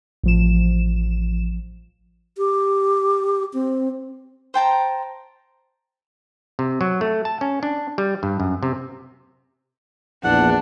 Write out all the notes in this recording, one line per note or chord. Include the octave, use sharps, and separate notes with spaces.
A1 F3 E7
G4
C4
C5 G5 A5 A#5
C3
F#3
A3
A5
C#4
D4
G3
G2
F#2
C3
A#1 E2 D4 F#5